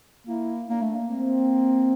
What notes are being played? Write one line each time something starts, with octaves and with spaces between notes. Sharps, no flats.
A#3 E4
A#3 D4
A3
A#3
C4